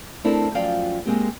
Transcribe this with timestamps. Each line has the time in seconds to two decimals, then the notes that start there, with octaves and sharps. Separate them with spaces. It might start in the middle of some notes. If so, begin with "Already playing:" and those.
0.24 A3 C4 D4 E4 A4 A#4
0.54 F#2 F3 F4 D5 F5 G5
1.06 G#3 A#3 C4 G4